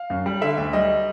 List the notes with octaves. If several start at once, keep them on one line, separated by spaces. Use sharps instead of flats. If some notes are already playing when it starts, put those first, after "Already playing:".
Already playing: F5
F#2
G3
D3 E5
D2
G3 D#5